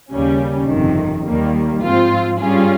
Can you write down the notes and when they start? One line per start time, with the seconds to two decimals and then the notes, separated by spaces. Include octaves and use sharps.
0.11 D#2 C#3 G3 C#4
0.69 G1 F2 C3 D#3
1.25 D#2 D#3 G3 A#3
1.82 G#2 F3 C4 F4
2.39 G2 G3 C#4 F4 G#4